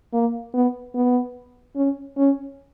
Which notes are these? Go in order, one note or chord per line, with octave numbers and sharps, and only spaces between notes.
A#3
B3
B3
C#4
C#4